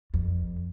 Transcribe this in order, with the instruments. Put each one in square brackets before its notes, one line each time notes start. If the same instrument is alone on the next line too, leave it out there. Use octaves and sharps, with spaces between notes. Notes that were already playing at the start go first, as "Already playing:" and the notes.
[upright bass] F2